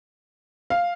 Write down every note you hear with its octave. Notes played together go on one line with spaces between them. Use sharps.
F5